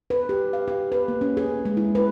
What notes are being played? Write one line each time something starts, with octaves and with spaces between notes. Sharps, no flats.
B4
G4
F5
G4
B4
A#3
C#4
G#4
G#3
E4
B4